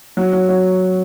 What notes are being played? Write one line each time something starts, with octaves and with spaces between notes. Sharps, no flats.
F#3
F#3
F#3